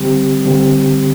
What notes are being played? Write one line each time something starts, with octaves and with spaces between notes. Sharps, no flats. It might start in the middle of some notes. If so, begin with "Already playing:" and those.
Already playing: D3 G3 C4 G4
D3 G3 C4 G4